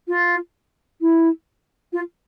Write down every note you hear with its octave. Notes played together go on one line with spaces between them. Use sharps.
F4
E4
F4